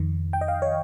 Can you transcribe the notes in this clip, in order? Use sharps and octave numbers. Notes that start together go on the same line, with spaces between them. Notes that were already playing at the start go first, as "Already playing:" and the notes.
Already playing: F2 D#3
G5
D#5
F5
C#5